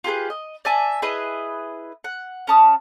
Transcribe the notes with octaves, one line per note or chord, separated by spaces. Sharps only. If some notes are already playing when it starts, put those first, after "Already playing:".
F4 G4 G#4 B4
D#5
D5 E5 G#5 A5
E4 G#4 B4 D#5
F#5
C#4 A5 D#6